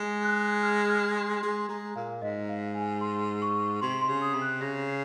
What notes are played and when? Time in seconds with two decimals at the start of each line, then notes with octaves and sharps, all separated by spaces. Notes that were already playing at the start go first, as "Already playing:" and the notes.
Already playing: G#3
0.23 F#6
0.62 F6
0.89 F6
1.16 C6
1.42 G#3 C6
1.69 G#3 A#5
1.96 A#2 F5
2.22 G#2 D#5
2.49 F5
2.75 G#5
3.01 C6
3.42 C#6
3.81 C3 C6
4.01 C6
4.08 C#3
4.22 D#6
4.34 C3
4.42 F#6
4.61 C#3 A#6
4.88 C7